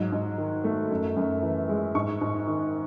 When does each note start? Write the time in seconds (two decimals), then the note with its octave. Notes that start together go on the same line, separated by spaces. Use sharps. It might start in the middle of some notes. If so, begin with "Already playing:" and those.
Already playing: G#2 F#3
0.12 G#2
0.38 D#3
0.64 A3
0.91 F#2
1.16 F#2
1.43 E3
1.69 G#3
1.95 G#2 C#6
2.21 G#2
2.47 D#3